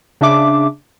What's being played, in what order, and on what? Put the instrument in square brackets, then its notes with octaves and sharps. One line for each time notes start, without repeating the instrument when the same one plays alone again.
[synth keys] C#3 D4 E5 D6